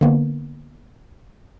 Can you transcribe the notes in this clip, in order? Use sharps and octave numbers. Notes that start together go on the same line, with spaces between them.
D3 A#3 B3